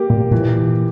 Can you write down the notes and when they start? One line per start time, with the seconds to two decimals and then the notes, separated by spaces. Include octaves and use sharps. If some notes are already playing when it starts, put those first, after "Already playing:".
Already playing: A#3 G4
0.10 A#2
0.31 A#2 E3